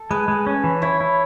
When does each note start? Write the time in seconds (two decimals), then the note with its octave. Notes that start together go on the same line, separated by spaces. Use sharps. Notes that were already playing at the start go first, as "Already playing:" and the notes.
Already playing: A4
0.11 G#3 B4
0.28 G#3
0.46 C#4
0.64 E3
0.82 E4 C#5
1.00 E4